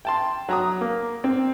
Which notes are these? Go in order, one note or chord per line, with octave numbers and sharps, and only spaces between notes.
G5 A5 C6
F#3 A#5 D#6
A#3
C4